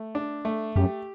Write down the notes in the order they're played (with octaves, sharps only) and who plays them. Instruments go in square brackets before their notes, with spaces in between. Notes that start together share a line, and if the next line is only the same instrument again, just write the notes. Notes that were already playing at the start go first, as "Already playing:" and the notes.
Already playing: [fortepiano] A3
D4
A3
[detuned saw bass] F#2 [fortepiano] G4